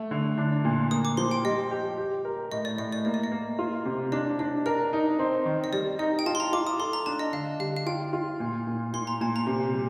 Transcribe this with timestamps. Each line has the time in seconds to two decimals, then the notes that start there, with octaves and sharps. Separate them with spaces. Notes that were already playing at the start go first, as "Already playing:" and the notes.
Already playing: A3
0.11 D3
0.38 D4
0.65 A#2
0.91 A#3 D#6
1.05 D6
1.17 F3 C6
1.31 G5
1.44 G3 D#5
1.71 G4
1.98 G4
2.25 A#4
2.52 A2 D#5
2.65 D5
2.78 A2 D#5
2.92 D5
3.05 A#3 D#5
3.14 D5
3.24 D#5
3.32 A#3
3.59 F4
3.85 C3
4.12 D4 D#5
4.39 D4 D#5
4.66 A#4 D#5
4.93 D#4
5.19 C4
5.46 D#3
5.64 D#5
5.73 G3 D5
5.99 D#4 D#5
6.19 G5
6.26 F4 A5
6.35 C6
6.40 A#5
6.53 F4 D6
6.67 D#6
6.79 A4 C6
6.93 A#5
7.06 D4 A5
7.19 D#5
7.33 D3 F5
7.60 G3 F5
7.76 F5
7.86 F4 G5
8.13 F4
8.40 A#2
8.67 A#2
8.93 A#2 C6
9.07 A#5
9.21 A#2 A5
9.36 A#5
9.47 C3
9.73 G3